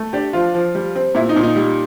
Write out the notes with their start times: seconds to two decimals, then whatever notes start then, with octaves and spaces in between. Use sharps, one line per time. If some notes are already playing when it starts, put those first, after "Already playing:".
Already playing: A3
0.13 D4 G4
0.33 F3 F4
0.55 F3
0.75 G3
0.95 C4
1.15 A#2 E4
1.29 D#4
1.36 A#2
1.43 D#4
1.56 G3